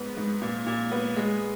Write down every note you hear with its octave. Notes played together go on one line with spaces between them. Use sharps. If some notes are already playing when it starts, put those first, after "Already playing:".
Already playing: G#2 B3
G#2
A#2
A#2
B3
G#3